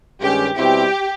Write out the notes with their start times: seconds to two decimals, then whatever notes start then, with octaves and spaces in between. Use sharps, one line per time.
0.20 G2 D#3 G#3 C#4 G4
0.57 B2 G3 C4 E4 G4